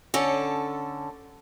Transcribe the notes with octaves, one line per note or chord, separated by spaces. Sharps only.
D3 C#4 A4